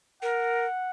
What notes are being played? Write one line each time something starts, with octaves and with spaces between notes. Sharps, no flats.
A#4 F#5